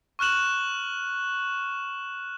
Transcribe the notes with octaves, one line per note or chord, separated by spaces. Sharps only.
C#6 F6 F#6 E7 F#7